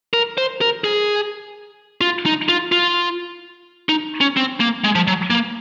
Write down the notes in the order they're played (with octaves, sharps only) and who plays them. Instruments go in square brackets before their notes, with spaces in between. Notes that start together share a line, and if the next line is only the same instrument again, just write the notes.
[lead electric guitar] A#4
C5
A#4
G#4
F4
D#4
F4
F4
D#4
C#4
C4
A#3
G#3
F3
F#3
A#3